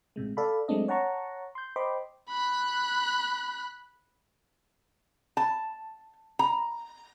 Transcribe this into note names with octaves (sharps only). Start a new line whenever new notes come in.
A1 A2 C3 G#3
A4 D5 F5 B5
F#3 G#3 A3 C4 D4 D#5
C#5 F#5 A5 A#5 C#6
C6 G6
C5 D#5 G5 B5 C6 D6
B5 F#6
A5
A#5